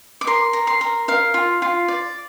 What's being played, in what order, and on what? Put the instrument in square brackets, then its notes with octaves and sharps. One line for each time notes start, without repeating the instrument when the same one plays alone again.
[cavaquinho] D6
A#4 C6
A#4
C6
A#4
A#4 F5
F4
F4
D5